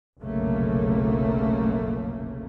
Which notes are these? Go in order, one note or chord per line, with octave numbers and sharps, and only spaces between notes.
F1 B1 F#2 C#3 A3 A#3